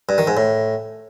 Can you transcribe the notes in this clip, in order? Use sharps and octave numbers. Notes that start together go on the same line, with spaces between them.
G2
D#3
G#2
A2